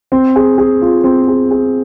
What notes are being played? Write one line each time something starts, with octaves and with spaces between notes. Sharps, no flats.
C4
G#4
G#4
F4
C4
G#4
G#4